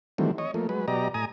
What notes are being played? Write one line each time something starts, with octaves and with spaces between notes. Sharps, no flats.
D#3 E3 F#3 G3 A3 C4
C#5 D#5
F3 A3 A#3
F#3 G#3 B4
B2 F#3 G4 D5 D#5 A#5
A2 G#5 A#5 D#6